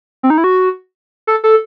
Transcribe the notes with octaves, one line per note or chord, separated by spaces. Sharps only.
C4
D#4
E4
F#4
A4
A4